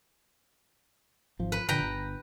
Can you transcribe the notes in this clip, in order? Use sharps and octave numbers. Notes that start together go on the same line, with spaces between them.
G#1 F3
B4
A#2 D3 F3 B4 G5 A#5
G1